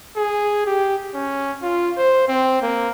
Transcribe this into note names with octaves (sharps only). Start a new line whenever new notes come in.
G#4
G4
C#4
F4
C5
C4
A#3